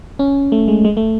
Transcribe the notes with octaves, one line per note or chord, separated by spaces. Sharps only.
C#4
A3
G#3
G#3
A3